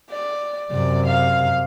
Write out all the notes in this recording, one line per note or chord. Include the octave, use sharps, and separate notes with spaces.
D5
F#2 C3 D5
F5